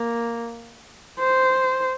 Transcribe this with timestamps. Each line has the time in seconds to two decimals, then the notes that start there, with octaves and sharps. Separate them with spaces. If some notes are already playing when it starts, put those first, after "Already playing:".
Already playing: A#3
1.19 C5